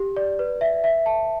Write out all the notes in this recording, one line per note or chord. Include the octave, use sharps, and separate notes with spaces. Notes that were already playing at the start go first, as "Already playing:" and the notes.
Already playing: G4
D5
B4
E5
E5
A5